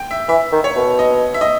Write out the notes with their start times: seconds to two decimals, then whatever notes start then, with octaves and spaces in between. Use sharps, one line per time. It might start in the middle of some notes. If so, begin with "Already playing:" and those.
Already playing: G5
0.11 E5
0.28 E3 E5
0.52 D#3
0.64 C#5
0.76 B2
0.99 D#5
1.34 E5
1.41 D#5